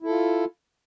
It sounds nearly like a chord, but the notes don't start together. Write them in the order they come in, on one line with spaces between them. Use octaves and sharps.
E4 A4 F4